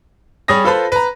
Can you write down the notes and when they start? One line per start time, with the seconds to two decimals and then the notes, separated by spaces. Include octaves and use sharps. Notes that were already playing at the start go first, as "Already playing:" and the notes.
0.48 G3 G#4 C#5 D#6 A#6
0.64 F4 A4 B4 C5 B5
0.92 B4 A#5